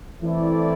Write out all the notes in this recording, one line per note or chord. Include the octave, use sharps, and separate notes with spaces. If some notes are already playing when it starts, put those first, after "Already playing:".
E3 A3 C4 E4 A4 D5